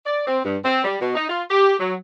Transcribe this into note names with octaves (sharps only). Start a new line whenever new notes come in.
D5
C4
G2
C4
G3
B2
D#4
F4
G4
F#3